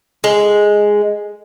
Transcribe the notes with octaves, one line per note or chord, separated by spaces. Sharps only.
G#3